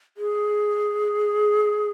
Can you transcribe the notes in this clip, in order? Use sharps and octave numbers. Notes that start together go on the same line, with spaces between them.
G#4